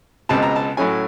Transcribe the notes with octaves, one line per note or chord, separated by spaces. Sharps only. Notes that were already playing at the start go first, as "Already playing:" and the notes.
C#2 B2 G#3 C4 A5
A#5
A5
A2 F#3 A3 C#4 G#5